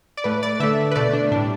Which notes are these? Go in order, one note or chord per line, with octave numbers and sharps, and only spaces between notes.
D5
A2 A3 B4
D5
D3 A3 E5
B4
B2 A3 D5
D4
A2 G3 D4